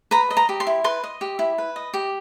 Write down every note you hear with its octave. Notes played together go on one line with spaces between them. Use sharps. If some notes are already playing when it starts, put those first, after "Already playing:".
B4 A#5
D#5
A#5
G4
C6
E4
B4 C6
D#5
G4
E4
B4
D#5
G4